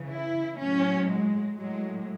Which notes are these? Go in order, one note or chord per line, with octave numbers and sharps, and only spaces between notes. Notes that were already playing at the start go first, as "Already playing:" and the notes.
Already playing: C#3 E3
E4
A2 F#3 C#4
G#3
A2 F#3 G#3